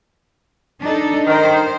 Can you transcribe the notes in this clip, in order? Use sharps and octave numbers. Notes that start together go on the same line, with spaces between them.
D4 D#4 A4
D#3 C5